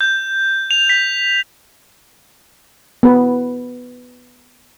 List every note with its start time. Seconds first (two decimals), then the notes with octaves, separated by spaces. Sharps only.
0.01 G6
0.71 F7
0.89 B6
3.03 B3 B4